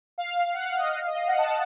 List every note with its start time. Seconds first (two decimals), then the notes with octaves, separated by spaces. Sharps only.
0.18 F5
0.53 F#5
0.57 F5
0.78 D#5
0.98 F5
1.07 D#5
1.15 F5
1.27 F#5
1.38 A5